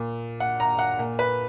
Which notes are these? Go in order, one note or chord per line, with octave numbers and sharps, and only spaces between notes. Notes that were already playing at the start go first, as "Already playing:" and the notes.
Already playing: A#2
F#5
A#5
F#5
A#2
B4